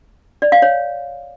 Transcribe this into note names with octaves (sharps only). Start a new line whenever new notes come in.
D5
F5
C#5